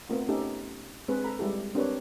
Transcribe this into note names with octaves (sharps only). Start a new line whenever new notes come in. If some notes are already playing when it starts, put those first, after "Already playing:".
A3 B3 C4 F4 A#4
A3 B3 C#4 D#4 G4 A4
G#3 C4 D4 G#4 B4
A4 A#5 B5
G3 G#3 E4 G4 A4
C4 D4 G4 A#4 B4 C#5